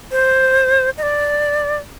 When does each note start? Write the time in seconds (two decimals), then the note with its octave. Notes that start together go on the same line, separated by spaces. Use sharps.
0.11 C5
0.98 D#5
1.03 D5